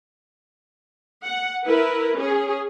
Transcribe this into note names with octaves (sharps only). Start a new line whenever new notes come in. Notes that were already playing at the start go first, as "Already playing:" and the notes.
F#5
E4 A#4 B4
C#4 G#4